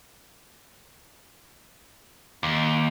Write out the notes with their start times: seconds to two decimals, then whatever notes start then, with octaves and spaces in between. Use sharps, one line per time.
2.43 D#2